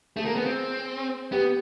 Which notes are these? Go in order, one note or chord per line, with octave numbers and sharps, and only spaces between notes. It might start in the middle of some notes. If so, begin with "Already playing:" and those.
A3 G#4
A#3
B3
C4
B3 G4